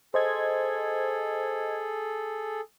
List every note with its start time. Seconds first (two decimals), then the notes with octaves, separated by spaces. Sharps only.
0.14 G#4 A4 C5 D#5 G#6